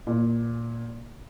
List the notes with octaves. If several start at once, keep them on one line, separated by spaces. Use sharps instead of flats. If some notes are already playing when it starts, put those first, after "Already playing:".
A#2